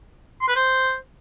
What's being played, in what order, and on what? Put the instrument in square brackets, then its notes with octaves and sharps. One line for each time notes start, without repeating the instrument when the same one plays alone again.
[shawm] C6
B4
C5